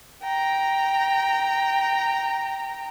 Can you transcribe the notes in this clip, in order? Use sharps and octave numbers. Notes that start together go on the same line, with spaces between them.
G5 A#5